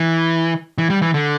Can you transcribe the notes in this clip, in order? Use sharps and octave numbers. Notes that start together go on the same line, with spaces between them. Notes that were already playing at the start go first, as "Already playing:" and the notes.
Already playing: E3
E3
G3
E3
D3